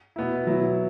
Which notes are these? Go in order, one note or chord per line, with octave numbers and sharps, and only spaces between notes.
B2 B3 E4
F#3 B3 E4